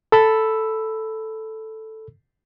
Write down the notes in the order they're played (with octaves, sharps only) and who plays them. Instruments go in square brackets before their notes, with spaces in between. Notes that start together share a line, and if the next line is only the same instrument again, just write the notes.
[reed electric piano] A4 B5 E6